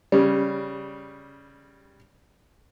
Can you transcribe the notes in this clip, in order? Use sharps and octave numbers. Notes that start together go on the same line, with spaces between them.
C#3 G3